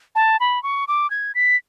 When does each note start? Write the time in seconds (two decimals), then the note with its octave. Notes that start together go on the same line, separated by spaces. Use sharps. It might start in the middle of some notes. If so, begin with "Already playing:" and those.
0.15 A5
0.40 B5
0.63 C#6
0.88 D6
1.10 G#6
1.35 B6